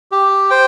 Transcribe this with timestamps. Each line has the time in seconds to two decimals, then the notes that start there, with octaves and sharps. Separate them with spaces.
0.12 G4
0.50 C5 G5